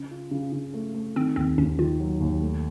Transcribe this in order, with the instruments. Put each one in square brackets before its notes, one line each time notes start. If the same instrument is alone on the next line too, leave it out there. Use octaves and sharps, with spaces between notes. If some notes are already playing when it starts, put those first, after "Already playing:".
Already playing: [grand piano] C#3 [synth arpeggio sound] C#4
[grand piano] F4
C#3
C#3
A3
A3
[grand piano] D#3 [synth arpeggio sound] C4
[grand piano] D#2 [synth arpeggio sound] C4
[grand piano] D#2 [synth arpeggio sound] C#4
[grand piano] D#3 [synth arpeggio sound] F4
[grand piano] F#3
D#2
A3